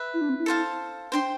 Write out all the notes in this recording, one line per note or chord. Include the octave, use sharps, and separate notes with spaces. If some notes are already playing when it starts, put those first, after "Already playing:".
Already playing: B4 E5
E4
D4
C4
E4
A4 C5 F5 A5
D4 C5 G5 C6